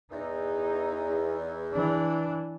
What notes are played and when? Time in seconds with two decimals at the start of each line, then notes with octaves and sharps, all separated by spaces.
0.11 E2 D#4
1.72 E3 D4